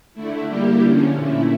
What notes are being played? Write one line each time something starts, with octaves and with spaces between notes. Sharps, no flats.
D3 A3 E4
G3 A#3 E4 G4
D3 F3 C#4
A#2 A3 E4